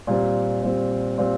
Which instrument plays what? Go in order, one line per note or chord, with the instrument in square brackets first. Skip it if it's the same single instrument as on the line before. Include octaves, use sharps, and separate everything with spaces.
[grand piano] A#2 G3 C4
A#2 G3 C4
A#2 G3 C4